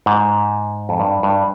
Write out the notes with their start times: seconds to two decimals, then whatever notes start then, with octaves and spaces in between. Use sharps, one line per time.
0.06 G#2
0.89 F2
1.00 G2
1.23 G2